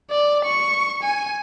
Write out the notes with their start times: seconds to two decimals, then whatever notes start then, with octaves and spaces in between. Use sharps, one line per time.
0.11 D5
0.45 C#6
1.03 G#5